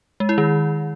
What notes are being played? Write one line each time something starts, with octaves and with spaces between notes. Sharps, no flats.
G#3
E4
D#3